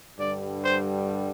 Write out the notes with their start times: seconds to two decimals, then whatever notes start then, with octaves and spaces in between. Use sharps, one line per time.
0.18 G2 D3 G3 D5
0.65 C5